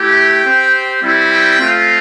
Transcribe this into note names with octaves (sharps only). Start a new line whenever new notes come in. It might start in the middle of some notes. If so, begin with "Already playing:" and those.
Already playing: A3 E4 G4
G5
C4 G4
G3 C4 E4
G5
A3 C4 F4